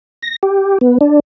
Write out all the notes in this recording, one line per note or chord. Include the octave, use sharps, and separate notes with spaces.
A#6
G4
B3
D4